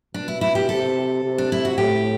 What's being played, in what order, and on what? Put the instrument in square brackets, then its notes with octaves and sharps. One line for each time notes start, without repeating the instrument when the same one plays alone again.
[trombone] B2 [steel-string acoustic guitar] D4
[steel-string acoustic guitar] E4
E4
G4
[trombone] C3 [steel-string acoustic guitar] A4
[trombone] C3
[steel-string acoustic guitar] D4
E4
F#4
[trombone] A2 [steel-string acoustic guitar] G4